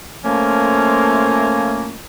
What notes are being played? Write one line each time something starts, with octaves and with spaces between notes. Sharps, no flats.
F3 A3 A#3 C#4 F4